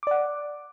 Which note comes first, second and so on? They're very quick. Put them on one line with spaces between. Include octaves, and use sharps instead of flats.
D6 D5 F#5